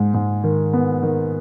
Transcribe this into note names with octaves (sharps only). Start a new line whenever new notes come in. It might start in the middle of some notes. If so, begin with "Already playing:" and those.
Already playing: G#2 G#3
G#2
D#3
B3
D#3